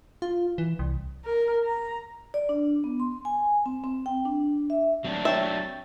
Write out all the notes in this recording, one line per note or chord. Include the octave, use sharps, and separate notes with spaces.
F4
E3
C2
A#4
A#5
D5
D4
B3
C6
G#5
C4
C4
G5
D4
E5
F#3 C4 D4
C#5 E5 G5 A6